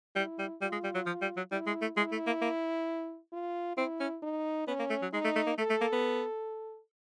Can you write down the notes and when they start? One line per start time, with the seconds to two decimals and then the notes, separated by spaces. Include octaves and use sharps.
0.15 G3 E4
0.38 G3
0.61 G3 F4
0.72 G#3
0.83 G3
0.95 F#3
1.06 F3
1.21 G3
1.36 F#3
1.51 G3 E4
1.67 G#3
1.81 A3
1.97 G#3 E4
2.12 A3
2.26 A#3
2.41 A#3
3.32 F4
3.77 C4 E4
4.00 C#4
4.22 D#4
4.67 B3 C#4
4.79 A#3
4.90 A3
5.02 F#3
5.13 G#3 D#4
5.24 A3
5.35 A3
5.46 A#3
5.57 A3 A4
5.70 A3
5.81 A#3
5.92 B3